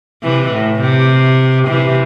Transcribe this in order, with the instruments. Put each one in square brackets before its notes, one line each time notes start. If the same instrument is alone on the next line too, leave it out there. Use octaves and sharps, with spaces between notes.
[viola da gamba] C3 E3
A2
C3
C3 E3